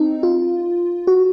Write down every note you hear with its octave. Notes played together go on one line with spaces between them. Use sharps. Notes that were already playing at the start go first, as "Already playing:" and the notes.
Already playing: C4 D#4
F4
F#4